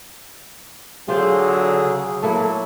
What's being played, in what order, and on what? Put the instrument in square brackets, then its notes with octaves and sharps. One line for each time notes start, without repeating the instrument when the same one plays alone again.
[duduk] D3 [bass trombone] F#3 [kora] F4 C5 F5 [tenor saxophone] G#4
[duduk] C#3
[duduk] F#3 [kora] A#3 E4 A4